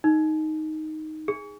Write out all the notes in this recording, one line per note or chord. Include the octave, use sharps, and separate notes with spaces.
D#4
G#4